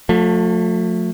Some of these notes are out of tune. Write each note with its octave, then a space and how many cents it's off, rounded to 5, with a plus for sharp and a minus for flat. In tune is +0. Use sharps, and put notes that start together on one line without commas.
F3 +45 A3 +15